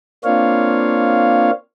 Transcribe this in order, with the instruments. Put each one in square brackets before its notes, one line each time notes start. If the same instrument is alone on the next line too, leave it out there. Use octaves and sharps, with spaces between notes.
[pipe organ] A#3 C4 D4 F4 C#5 F5